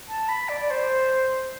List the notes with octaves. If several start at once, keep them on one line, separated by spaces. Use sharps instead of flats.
A5
B5
D5
D5
C5